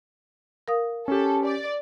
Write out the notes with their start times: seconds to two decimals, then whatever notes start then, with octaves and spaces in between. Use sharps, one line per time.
0.68 A#4 F5 D#6
1.08 C#4 G4 A4
1.45 D5